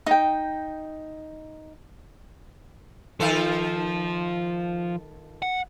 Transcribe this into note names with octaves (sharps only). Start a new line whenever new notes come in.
D#4 G5
D#3 F3 F4 A4
F#5